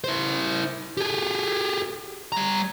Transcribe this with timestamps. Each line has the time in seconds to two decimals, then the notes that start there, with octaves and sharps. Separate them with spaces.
0.04 E4 C5
0.97 G4 G#4
2.32 G3 A#5